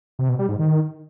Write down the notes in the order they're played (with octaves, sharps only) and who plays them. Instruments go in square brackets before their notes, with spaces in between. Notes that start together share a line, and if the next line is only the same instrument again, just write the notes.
[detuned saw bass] C3
B2
G3
G#2
D#3